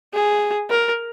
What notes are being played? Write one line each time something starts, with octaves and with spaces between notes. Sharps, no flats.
G#4
A#4